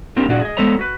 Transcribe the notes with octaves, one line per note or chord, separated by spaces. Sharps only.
A#3 C4 D4 G4 A#4
A#2 D4 F#4 G#4 D5
G#4 D#5
G#3 B3 A4 C5 C#5 A#5
F#4 B4